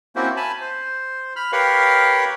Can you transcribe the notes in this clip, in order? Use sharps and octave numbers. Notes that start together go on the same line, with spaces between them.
A#3 C4 C#4 E4 F#4 C5
G#5 A5 B5
C5
B5 F6
G4 A#4 B4 C#5 F5